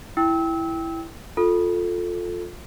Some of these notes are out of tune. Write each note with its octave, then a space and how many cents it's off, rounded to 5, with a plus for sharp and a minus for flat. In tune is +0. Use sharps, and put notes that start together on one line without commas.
E4 +5 G5 +0 E6 -30
F4 +20 A4 +0